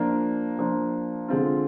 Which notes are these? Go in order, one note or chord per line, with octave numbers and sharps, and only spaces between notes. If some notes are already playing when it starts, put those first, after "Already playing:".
Already playing: F3 A#3 D4
F3 A#3 D4
D3 G#3 C4 F4